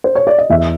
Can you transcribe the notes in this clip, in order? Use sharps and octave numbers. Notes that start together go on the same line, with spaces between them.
C5
C#5
D5
D#5
E2 E5